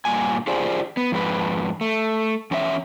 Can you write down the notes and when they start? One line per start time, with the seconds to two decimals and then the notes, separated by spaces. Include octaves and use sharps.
0.05 G2 A#2 G#5
0.47 F4 G4 G#4 C5 D5
0.97 B3
1.12 F2 G#2 D4 B4
1.81 A3
2.51 E2 C#4 F4 E5